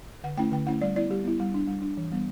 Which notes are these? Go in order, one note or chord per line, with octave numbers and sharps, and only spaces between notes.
D3 F#5
A3 C#4 E4 G5
D3 G5
A3 C#4 E4 F#5
G3 D5
B3 E4 D5
G3 G4
B3 E4
G3
D4
G3
D4
E3
G3 B3